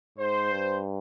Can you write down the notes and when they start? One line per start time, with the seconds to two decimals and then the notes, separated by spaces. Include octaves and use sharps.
0.18 G#2 C5
0.51 G2